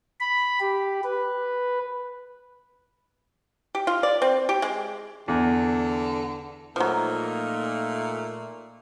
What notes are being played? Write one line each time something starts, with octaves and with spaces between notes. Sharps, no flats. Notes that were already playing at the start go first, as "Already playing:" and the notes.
B5
G4
B4
G4
F4
D5
C4
G4
G#3
E2 D3
A#2 F3 F#3 A3 A#3 D#4